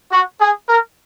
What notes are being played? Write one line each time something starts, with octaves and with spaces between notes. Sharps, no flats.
F#4
G#4
A#4